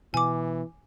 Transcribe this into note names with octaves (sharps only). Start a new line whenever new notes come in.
B2 E3 G#5 D6